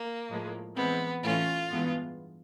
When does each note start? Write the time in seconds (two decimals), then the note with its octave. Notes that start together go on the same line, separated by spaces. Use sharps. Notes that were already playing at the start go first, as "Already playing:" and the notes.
Already playing: A#3
0.29 A2 F3 G#3
0.76 E3 G#3 B3 C4
1.24 A2 E3 A3 C#4 F4
1.71 G2 E3 G#3 B3